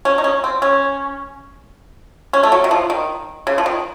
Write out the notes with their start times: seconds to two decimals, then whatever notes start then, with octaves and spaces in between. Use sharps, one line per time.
0.05 C#4
0.18 D#4
0.24 C#4
0.44 C4
0.62 C#4
2.33 C#4
2.43 A3
2.52 F#3
2.64 D#3
2.71 F3
2.90 D#3
3.47 C#3
3.58 F3
3.66 D#3